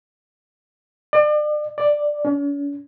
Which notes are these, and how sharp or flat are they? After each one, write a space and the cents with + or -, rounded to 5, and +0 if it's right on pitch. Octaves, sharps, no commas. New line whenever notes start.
D5 +35
D5 +5
C#4 +45